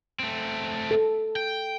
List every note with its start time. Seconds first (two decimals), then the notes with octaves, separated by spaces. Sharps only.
0.20 A3 C4
0.91 A4
1.36 G5